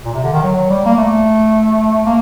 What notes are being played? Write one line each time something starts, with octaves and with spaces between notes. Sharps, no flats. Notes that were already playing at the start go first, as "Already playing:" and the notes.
A#2
C3
D3
D#3
F#3
G3
A#3
A3
A#3